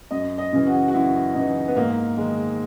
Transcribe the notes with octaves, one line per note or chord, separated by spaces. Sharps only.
F#2 D#5
D#5
C#3 E3
F#4
F#4
F#2 E4
C#3 E3 D#4
B3
G#2 A#3
D#3 G#3